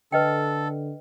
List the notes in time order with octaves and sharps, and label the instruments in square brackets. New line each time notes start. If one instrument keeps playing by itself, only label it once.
[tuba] D3 [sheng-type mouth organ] A4 [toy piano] B4 D#5 G5